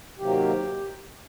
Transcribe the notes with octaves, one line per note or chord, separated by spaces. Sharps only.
C3 D#3 F#3 A#3 G4